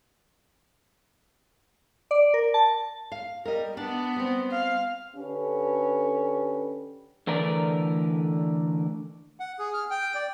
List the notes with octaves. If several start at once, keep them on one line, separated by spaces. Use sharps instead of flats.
D5
A#4
A5
F5
G3 A#4 D#5
B3 D4
G3 C4
F5
D3 C#4 G4 A4 B4
D3 E3 A3 A#4 B4 D5
F#5
G#4
F6
G5
D5